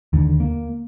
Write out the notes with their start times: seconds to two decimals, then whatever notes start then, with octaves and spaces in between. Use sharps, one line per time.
0.13 D#2 D3
0.40 A#3